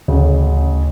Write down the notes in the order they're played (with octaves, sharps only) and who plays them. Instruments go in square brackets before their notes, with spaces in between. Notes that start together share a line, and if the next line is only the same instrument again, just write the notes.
[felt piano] A1 C#3 [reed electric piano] D2